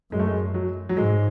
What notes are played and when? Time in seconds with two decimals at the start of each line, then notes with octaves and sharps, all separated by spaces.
0.12 F#2 G#3
0.19 A3
0.27 G#3
0.54 F#3
0.89 F#3
0.97 G#2 G#3